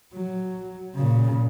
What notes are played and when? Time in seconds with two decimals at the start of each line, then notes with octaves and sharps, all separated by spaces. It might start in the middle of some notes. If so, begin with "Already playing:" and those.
0.13 F#3
0.96 A#2 C#3